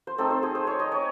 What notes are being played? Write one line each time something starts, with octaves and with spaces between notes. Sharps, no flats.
C5
A3 C4 D#4 A4
C5
G#4
C5
C#5
D#5
C#5